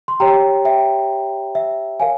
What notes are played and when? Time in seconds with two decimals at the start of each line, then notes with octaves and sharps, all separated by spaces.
0.08 C6
0.20 G4 C#5 G5 A#5
0.65 E5 G5
1.55 E5
2.00 A#4 C#5 F5 G#5